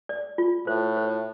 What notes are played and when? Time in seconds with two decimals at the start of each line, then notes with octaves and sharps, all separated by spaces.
0.09 D5
0.38 F4
0.67 A2 C5
0.97 C5